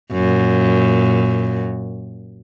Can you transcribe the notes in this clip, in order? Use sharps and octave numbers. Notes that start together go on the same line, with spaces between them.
F#2 A#2